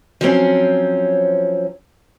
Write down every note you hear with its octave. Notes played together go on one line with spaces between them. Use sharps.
F3 F#3 C4 C#4